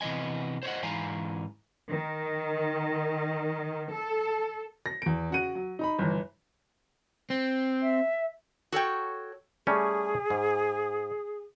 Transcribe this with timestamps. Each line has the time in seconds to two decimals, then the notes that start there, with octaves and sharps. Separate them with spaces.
0.01 C3 E3 B3 D#5 G#5
0.63 C5 C#5 D#5 F#5
0.83 G#2 E3 F5 G#5 A#5
1.91 D#3
3.92 A4
4.86 A#6
5.02 E2 D7
5.30 C#3 F#4 D#7
5.55 F#3
5.79 D#4 A#5 B5
5.99 G1 E3
7.30 C4
7.82 E5
8.72 F#4 A4 C#5 G5
9.67 G3 A3 C#4 G#4
10.30 G#2